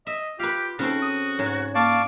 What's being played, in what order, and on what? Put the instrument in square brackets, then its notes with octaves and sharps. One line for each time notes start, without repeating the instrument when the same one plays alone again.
[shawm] D#5 [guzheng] E5
[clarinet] F4 [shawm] G4 [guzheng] B4 F5
[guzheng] C#3 C4 A4 [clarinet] D#4 [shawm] F#4
[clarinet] D#6
[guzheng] G#2 [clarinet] C#5
[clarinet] A#3 [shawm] D5 [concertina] F5 A5 C#6